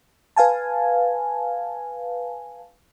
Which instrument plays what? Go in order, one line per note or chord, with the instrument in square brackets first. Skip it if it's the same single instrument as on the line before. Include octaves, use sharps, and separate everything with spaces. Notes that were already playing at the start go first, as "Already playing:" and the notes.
[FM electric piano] B4 F5 G#5 A5